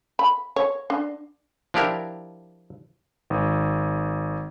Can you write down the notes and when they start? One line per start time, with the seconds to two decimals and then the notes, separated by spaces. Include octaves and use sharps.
0.19 B5
0.56 C#5
0.90 D4
1.74 F3 D4 E4 G4 A#4
3.30 G#1